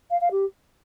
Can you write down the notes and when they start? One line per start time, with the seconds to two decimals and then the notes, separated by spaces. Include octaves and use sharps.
0.11 F5
0.21 F5
0.31 G4